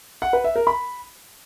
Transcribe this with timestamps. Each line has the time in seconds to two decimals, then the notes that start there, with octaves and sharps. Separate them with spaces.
0.22 F#5
0.33 B4
0.44 E5
0.56 A#4
0.67 B5